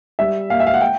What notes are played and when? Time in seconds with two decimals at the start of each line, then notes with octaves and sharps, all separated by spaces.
0.19 G3 E5
0.50 A#3 F5
0.60 E5
0.67 F5
0.74 F#5
0.81 G5